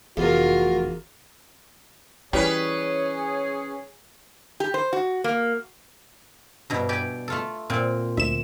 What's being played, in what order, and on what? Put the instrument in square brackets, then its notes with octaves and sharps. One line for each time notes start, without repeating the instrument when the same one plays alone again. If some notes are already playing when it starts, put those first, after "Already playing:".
[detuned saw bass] F1 [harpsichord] E2 [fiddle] F4 A#4 [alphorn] F#4
[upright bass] E3 E4 [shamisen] G3 [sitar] C#4 B4 [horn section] G#4 C#5
[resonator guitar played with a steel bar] G4
C5
F#4
A#3
[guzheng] G2 B2 E4
G4 D5 G#5
A3 F4 A4
A#2 C4
[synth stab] D2 E7 [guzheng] E5